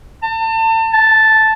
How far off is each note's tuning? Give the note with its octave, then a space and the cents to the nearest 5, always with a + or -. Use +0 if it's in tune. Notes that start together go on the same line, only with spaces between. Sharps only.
A5 +35
A5 -5